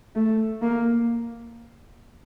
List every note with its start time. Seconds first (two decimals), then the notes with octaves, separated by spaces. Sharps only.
0.15 A3
0.62 A#3